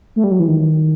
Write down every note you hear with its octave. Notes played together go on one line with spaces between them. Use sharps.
A3
G3
F#3
E3
D#3